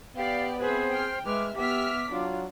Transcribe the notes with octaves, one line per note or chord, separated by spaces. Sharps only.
B3 G4 D5 F5
C4 G#4 B4 C5 E5
G5 F6
G#3 B4 E5 D6 F6
B3 G4 E5 D6 F6 B6
F#3 D4 F4